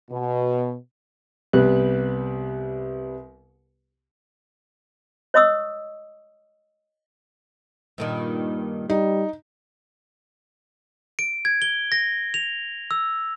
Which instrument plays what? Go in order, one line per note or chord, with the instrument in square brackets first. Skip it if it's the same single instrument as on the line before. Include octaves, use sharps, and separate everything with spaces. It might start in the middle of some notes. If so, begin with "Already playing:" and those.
[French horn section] B2
[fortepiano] C2 G3 B3 B4 F#6
[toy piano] C#5 D#5 C#6 D#6 E6
[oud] G2 A#2 D#3
[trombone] G3 [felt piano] D#4
[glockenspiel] D7
G#6
G7
A#6
F7
E6